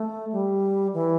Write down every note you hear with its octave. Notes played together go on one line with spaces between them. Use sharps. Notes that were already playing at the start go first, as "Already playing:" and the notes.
Already playing: A3
G3
E3